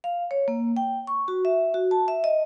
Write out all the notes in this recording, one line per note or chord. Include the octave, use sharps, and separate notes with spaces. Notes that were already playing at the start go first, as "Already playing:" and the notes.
F5
C#5
A#3
G5
C#6
F#4
E5
F#4
A5
E5
D#5